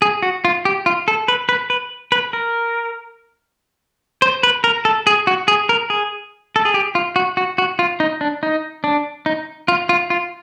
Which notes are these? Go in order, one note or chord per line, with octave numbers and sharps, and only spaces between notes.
G#4
F#4
F4
G4
F4
A4
B4
B4
B4
B4
A#4
C5
B4
A#4
A4
G#4
F#4
G#4
A#4
G#4
A4
G#4
G4
F4
F#4
F#4
F#4
F4
D#4
D4
D#4
D4
D#4
F4
F4
F4